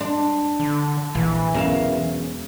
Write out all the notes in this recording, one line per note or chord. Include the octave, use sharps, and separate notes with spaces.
D4 C6
D3
A#1 E3
E1 E2 F#3 C#4 A#4 F5 E7